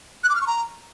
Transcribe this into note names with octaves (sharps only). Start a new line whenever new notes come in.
F#6
D6
F6
C#6
A#5